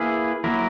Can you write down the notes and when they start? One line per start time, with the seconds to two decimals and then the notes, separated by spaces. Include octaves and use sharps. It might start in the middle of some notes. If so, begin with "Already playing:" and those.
Already playing: A#3 E4 G#4 B4
0.44 F#3 A#3 E4 A#4